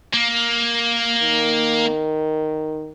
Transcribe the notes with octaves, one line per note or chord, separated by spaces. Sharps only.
A#3
D#3